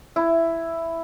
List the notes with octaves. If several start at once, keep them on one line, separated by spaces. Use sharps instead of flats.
E4